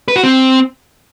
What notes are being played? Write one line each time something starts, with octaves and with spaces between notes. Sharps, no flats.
B4
F#4
C4